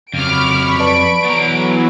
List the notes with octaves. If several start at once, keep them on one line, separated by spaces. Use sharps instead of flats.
F2 C#3 F#3 B5 C#6 D6 F6 D7
B4 D5 A5 D7
E3 F#3 B3 A#5